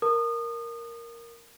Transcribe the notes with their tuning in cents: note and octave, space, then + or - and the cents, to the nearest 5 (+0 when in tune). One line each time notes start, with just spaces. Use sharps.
A#4 +0 A5 +35 D#6 -30